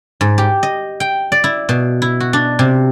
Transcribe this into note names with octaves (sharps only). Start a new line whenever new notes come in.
G#2
G4
D#5
G5
D5
E4
B2
E4
F#4
D4
C3